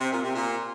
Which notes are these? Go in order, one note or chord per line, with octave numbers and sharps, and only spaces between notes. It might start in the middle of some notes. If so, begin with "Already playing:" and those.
C3
A#2
C3
A#2